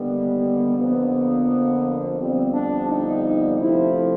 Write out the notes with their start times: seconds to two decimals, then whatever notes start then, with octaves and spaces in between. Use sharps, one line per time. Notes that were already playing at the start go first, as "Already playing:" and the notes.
Already playing: D#2 D3 G3 B3
0.76 F2 D3 F3 A#3 B3
2.17 F2 D3 G3 B3 C4
2.53 D4
2.88 D#4
3.59 C3 F3 A3 E4